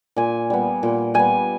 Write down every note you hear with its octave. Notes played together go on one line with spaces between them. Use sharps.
A#2 G#5
G3 B3
A#2
G3 B3 G#5